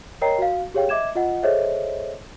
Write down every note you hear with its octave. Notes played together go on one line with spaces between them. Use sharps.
A#4 C#5 D#5 G5 A#5 C7
F#4 F5
G4 G#4 C#5 F5 G5
D#5 E5 D6 G#6 E7
F4 D#5 F#5
G#4 A4 C5 C#5 D#5 E5